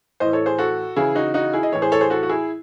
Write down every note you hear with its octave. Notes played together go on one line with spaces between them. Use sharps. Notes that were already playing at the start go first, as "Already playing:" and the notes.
A2 E3 C5 D#5
A4 C#5
G#4 C5
F#4 A4
C#3 E3 E4 G#4
D#4 F#4
D#4 F#4
E4 G#4
D#5
A2 E3 C#5
G#4 C5
A4 C#5
G#4 C5
F#4 A4
F#4
E4 G#4